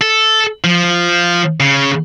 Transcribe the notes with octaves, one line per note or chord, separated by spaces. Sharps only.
A4
F3
C#3